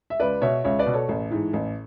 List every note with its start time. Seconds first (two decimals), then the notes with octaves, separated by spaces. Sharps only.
0.10 E5
0.20 C#2 B4 D5
0.42 B2 C#5 E5
0.64 C#2 C#5 E5
0.79 B4 D5
0.86 B2
0.94 A4 C#5
1.09 A1
1.31 G#2 E3
1.53 A1